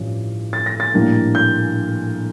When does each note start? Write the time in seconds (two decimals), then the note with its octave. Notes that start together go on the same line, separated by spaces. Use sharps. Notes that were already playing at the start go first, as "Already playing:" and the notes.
Already playing: A1 G2 F3 C#4
0.53 A6
0.66 A#6
0.80 A6
0.94 A#1 A2 G3 A#3 D4
1.35 G6